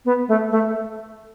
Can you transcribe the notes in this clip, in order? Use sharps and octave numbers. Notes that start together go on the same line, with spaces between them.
B3
A3
A3